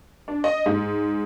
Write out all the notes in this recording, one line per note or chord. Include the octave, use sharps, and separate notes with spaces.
D4
D#5
G#2